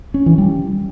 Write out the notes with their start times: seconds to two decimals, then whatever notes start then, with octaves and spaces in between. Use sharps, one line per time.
0.14 C#4
0.26 E3
0.38 G3